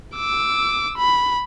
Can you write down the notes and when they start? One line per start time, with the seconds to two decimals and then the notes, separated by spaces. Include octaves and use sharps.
0.16 D6 E6
0.98 B5